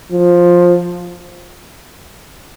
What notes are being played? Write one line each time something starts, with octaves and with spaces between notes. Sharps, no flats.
F3